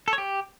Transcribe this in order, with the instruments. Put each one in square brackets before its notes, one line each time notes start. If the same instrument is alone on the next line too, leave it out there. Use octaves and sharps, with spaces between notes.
[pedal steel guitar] A4
C#5
G4